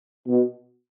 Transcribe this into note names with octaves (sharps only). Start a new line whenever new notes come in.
B2